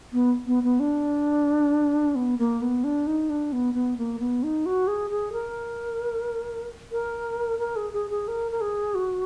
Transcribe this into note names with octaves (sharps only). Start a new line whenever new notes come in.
B3
B3
B3
D4
B3
A#3
B3
D4
D#4
D4
B3
B3
A#3
B3
D#4
F#4
G#4
G#4
A#4
A#4
A#4
G#4
G#4
G#4
A#4
A#4
G#4
F#4